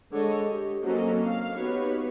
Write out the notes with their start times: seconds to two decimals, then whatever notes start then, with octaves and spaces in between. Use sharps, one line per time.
0.11 D3 G#3 G#4 A4 C#5 D#5
0.44 G4
0.83 F#3 A#3 C4 C#4 A4 D#5
1.23 F5
1.55 B3 D#4 F#4 G4 B4 C#5